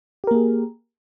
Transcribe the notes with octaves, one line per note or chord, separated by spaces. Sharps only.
A#3 G4 G#4 A#4